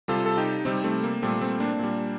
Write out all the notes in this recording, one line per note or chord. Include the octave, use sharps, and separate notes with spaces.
C3 G3 F4 A4
A4
D#4 G4
C3 G3 C4 D#4
A3 C4
A#3
A#2 G3 A3 C4
A3 C4
A#3 D4
A#2 G3